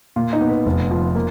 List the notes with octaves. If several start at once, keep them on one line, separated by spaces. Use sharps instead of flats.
A#2 F4
D#4
B3
B4
F1
F3
A#3